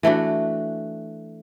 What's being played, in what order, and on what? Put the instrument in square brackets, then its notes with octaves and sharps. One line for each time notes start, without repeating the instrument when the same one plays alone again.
[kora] E3 A3 D4 F#4